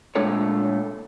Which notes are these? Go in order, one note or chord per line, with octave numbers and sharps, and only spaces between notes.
A#2 G#3 A3 D4 A4 C#5